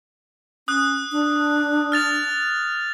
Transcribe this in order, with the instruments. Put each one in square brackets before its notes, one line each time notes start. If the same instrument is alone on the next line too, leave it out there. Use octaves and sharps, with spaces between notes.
[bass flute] C#4 [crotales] D#6 F#6
[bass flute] D4
[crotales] F6 A6 F7